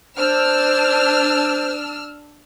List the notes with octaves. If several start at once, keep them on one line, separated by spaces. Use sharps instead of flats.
D4 C5 E6 F6